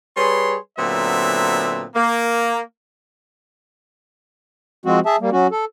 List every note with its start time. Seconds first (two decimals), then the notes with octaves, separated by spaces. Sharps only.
0.17 G3 G#4 B4 C#5 C6
0.78 A#2 D3 F#3 B3 C4 E5
1.95 A#3
4.86 F3 G#3 C4 F#4
5.06 G#4 E5 A5
5.21 G3 A#3
5.32 F#3 C#4 F#4
5.51 A4